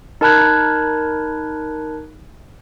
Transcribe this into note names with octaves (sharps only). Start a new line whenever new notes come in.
D#4 A#4 A5 B5 F#6 G#6